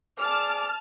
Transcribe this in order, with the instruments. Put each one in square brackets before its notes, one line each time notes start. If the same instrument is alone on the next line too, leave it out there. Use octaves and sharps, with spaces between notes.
[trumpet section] G#4 D5 D6 [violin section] A5 F6